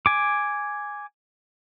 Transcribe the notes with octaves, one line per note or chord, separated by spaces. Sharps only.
G#5 D6